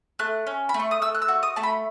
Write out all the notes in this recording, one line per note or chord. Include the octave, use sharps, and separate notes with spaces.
A3 F#6
C#4
B5
A3
C#6
D#6
A3 E6
F#6
E6
F#4
D#6
A3 A5
B5